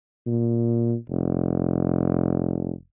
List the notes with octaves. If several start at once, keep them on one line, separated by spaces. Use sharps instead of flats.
A#2
F1